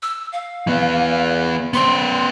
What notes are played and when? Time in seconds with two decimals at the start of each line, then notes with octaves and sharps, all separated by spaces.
0.02 E6
0.33 F5
0.67 E3 B3
1.74 B3 C5 C6